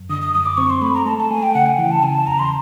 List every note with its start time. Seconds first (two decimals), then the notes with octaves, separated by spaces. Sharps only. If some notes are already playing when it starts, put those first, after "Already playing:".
Already playing: F#2
0.09 D3 D#6
0.21 D#6
0.34 F#2 D#6
0.46 D6
0.57 C4 C#6
0.70 C6
0.81 A3 B5
0.94 A#5
1.06 A3 A5
1.18 A5
1.31 A3 G#5
1.43 G5
1.54 C#3 F#5
1.66 G#5
1.78 E3 G5
1.91 A5
2.03 C#3 G#5
2.15 A5
2.27 E2 A#5
2.39 C6